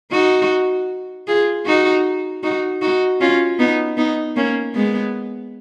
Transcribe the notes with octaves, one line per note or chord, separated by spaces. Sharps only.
D#4 F#4
F4 G#4
D#4 F#4
D#4 F#4
D#4 F#4
C#4 F4
B3 D#4
B3 D#4
A#3 C#4
G#3 B3